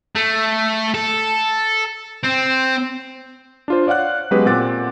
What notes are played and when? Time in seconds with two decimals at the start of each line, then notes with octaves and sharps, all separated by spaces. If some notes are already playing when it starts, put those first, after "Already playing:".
0.16 A3
0.94 A4
2.24 C4
3.68 D4 F4 C5
3.87 C#5 D5 F5 F#5 F#6
4.31 F#3 G#3 B3 C#4 G4 B4
4.46 A#2 C4 F#5 D6 A6